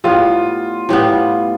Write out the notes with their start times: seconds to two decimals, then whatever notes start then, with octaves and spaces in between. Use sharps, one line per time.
0.04 A2 G3 B3 F4
0.89 A2 G3 B3